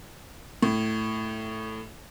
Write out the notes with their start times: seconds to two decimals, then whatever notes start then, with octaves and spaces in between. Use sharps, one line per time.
0.62 A2